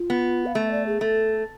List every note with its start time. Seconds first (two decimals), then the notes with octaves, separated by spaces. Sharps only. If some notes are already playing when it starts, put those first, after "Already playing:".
Already playing: F4
0.10 B3
0.46 F5
0.55 A3 E5
0.71 D5
0.86 G#4
1.01 A3 A4